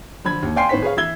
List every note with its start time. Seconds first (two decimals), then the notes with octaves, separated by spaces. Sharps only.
0.24 D3 F3 B5 G#6
0.43 D#2
0.56 D5 F5 G5 G#5 C6 C7
0.69 A2 D#3 B3 C5 C#5 B6
0.82 G#4 B4 C#5 F5
0.97 E3 E4 E6 G#6 G7